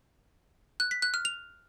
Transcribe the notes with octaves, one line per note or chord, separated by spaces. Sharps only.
F#6
B6
F#6
F6
F7